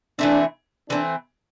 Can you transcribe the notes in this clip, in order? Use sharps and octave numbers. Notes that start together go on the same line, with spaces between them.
E3 A3 C4 D4
E3 A3 C4 D4